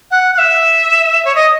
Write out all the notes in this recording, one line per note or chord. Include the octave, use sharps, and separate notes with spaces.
F#5
F#5
E5
C#5
D#5